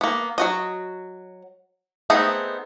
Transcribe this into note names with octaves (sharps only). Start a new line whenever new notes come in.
A#3 B3
F#3 F#4 D#5
A3 B3 C4 D#4 G#4